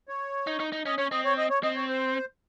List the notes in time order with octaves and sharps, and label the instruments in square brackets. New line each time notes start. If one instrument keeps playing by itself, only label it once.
[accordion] C#5
[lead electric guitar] D#4
D#4
D#4
[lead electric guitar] C#4 [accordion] D#5
[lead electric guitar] C#4 [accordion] C#5
[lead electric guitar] C4 [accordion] D#5
[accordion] C#5
D#5
C#5
[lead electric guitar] C4 [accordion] D#5
[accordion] C#5
C5